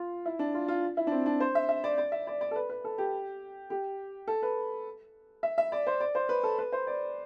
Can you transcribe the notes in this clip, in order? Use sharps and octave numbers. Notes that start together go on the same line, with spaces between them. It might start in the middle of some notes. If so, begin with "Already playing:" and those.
Already playing: F4
E4
D4
F4
F4
E4
D4
C4
D4
C5
E5
E5
D5
D5
E5
D5
D5
A4
B4
B4
A4
G4
G4
A4
B4
E5
E5
D5
C5
D5
C5
B4
A4
B4
C5
D5